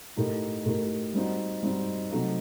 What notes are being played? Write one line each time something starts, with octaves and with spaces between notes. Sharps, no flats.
A2 A3 D#4 G4 A#4
A2 A3 D#4 G4 A#4
G3 C4 D#4 F#4
G3 C4 D#4 F#4
C3 F#3 A3 D#4